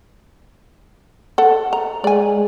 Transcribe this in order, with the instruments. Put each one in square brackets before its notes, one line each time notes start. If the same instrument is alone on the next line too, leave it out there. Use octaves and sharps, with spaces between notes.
[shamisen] A4 F#5
A#5
[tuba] G#3 [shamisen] D5 G#5